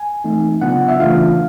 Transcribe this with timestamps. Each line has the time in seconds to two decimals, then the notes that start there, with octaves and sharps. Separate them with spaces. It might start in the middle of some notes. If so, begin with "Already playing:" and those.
Already playing: G#5
0.24 E3 A3 C4 D#4
0.61 C#3 F#3 B3 D4 F4 F#5
0.88 E5
1.00 C#3 E3 A3 D4 F4 F5